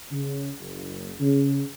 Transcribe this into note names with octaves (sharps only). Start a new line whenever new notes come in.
C#3
F#1
C#3